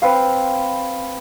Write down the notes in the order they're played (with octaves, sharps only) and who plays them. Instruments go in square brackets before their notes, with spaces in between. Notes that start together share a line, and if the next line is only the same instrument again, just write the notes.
[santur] C4 B4 F5